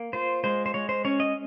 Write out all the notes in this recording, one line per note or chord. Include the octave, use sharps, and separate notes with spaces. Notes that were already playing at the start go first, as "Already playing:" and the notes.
Already playing: A#3
F4 C5
G#3 C5
C5
G#3 C#5
C5
C#4 C#5
D#5